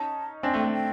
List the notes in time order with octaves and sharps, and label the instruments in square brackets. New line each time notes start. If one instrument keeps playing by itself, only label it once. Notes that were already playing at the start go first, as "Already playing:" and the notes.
Already playing: [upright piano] C#4 D#4 [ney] A5
[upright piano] C4 D4 [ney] G#5
[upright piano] A3
[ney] G5
[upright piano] A3
[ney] G5